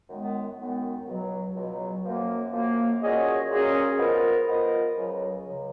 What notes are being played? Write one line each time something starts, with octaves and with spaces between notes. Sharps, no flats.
F#2 D#3 G#3 B3
F#2 D#3 G#3 B3
C#2 B2 F#3
C#2 B2 F#3
F#2 F3 A#3
F#2 F3 A#3
A#2 F#3 C#4 G#4 D#5
A#2 F#3 C#4 G#4 D#5
F3 B3 F4 A#4 D#5
F3 B3 F4 A#4 D#5
C#2 C#3 F#3
C#2 C#3 F#3